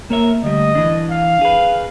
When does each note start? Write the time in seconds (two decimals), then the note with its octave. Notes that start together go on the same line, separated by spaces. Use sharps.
0.10 A#3 A#4 C#5 E5
0.43 D2 G3 D#5
0.75 E3 D4
1.11 F5
1.41 G#4 B4